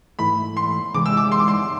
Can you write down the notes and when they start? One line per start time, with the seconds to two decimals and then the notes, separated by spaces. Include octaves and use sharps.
0.19 G#2 E3 A3 B5
0.57 C6
0.94 C3 E3 G#3 D6
1.06 E6
1.17 D6
1.32 C6
1.40 D6
1.48 C6